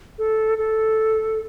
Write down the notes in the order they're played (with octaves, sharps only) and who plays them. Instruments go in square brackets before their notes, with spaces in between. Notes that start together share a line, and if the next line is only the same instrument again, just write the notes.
[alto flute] A4
A4